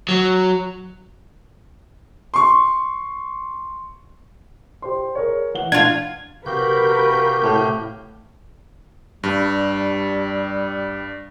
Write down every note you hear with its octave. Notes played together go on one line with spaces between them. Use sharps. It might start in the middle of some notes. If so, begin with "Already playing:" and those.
F#3
C6 C#6
G4 C5 C6
G#4 A#4 C#5
E3 F#5 G7
D4 F4 F#5 G#6
C3 F#4 G4 A#4 B4 F5 G6
A2
G2 G3